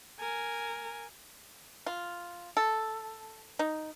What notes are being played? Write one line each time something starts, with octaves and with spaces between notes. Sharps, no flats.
A#4 G#5
F4
A4
D#4